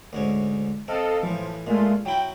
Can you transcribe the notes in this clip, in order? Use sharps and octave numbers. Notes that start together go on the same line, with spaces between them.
D2 G#2 C#4
C4 A4 D#5 F5
A2 E3 F3
A#2 G#3 A3 F4
F#3 E4 G5